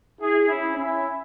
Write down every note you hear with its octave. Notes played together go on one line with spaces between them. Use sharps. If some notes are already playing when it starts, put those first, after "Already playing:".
E4 G#4
C#4 E4
C#4 E4